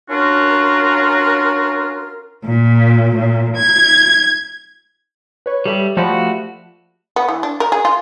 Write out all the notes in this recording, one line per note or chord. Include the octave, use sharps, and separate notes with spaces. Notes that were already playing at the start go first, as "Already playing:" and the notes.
C#4 D4 F4 F#4 A#4
A#2
A#2
G#6
B4 C#5
G3 G4 A4 E5
F3 A3 F#4 G4 D5 B5
B3
E3
D4
A#4
G#4
F4